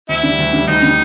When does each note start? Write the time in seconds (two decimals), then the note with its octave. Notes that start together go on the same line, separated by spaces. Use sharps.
0.09 D2 E4
0.23 D3 G3
0.39 D2
0.53 D3 G3
0.67 D2 D#4
0.83 D3 G3